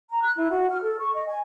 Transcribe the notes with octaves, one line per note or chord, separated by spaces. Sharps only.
A#5
F#6
E4
F#4
F6
A4
C#6
D#5
G#5